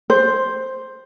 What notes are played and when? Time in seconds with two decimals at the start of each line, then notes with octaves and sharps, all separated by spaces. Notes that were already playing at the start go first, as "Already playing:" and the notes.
0.10 C5